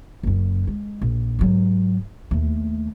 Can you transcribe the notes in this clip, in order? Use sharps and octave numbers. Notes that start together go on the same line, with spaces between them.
F#1 F#2
G#3
A#1
G#2 F#3
D#2 A3